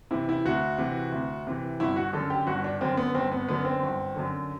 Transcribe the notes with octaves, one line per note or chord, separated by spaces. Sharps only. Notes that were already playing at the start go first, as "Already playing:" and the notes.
C3 E3 E4
E4
D2 F#4
C3 E3
D2
C3 E3
G1 E4
F#4
F#2 D3 A4
G4
G1 F#4
D4
F#2 D3 C4
B3
G1 C4
B3
F#2 D3 B3
C4
G1
F#2 D3